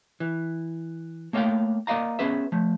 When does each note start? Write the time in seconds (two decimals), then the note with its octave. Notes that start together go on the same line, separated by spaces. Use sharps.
0.20 E3
1.33 A3 A#3 C#5 E5 F5 G5
1.87 A#3 D5 D#5 F5 A#5
2.19 B3 C#4 G#4 B4 E5
2.52 F3 A3